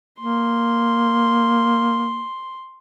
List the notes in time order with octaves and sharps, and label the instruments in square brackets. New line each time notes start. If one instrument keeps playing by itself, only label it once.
[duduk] A#3 [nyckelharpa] C6